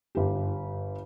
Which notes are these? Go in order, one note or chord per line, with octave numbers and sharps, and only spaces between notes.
G1 G4